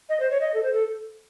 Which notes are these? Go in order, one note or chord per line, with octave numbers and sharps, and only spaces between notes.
D#5
C5
C#5
D#5
A4
C5
A4